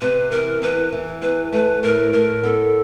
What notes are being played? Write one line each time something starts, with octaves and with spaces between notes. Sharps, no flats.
C3 B4
E3 A#4
E2 B4
E3
E2 B4
A3 B4
A2 A#4
A2 A#4
B3 A4